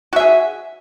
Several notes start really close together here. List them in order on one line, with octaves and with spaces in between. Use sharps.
F#4 E5 G#4